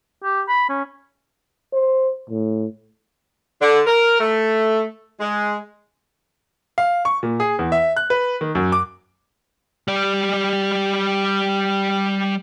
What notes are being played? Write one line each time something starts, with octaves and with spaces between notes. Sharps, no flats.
G4
B5
C#4
C5
A2
D3
A#4
A3
G#3
F5
C#6
A#2
G#4
E2
E5
F#6
B4
D#3
F#2
D6
G3 D5